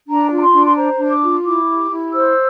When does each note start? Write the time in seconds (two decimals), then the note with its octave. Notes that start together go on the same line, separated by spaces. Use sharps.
0.07 D4 A#5
0.30 F4
0.37 A#5
0.42 C6
0.53 D4
0.65 C6
0.76 C5 A#5
0.99 D4
1.10 D6
1.21 F4
1.45 E4 D6
1.68 G4
1.91 E4
2.13 C5 E6